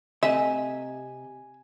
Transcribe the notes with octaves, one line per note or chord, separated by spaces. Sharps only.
C3 A3 D#5 E5 G#5